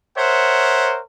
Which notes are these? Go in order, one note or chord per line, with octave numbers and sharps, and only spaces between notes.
A#4 C5 C#5 E5 F#5